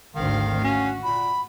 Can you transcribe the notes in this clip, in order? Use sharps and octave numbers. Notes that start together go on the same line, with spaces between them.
G#1 D2 D#3 C4 F5
C#4 F#4
A#2 B5